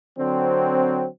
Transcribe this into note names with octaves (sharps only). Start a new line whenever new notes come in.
D3 F#3 C4